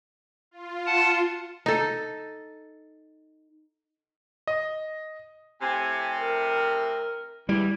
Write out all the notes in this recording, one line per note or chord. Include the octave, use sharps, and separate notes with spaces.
F4
F#5 A5
D#4 A4
D#5
A2 C3 G#5
A#4
E2 G3 E4